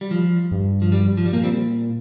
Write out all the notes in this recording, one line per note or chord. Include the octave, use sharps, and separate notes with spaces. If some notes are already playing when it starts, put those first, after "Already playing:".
G3
F3
G2
F3
G3
F3
G3
A#2 F3 A#3
G3 C4